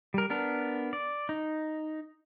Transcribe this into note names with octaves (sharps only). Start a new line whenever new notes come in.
G3 A#4
B3 D4 A#4
D5
D#4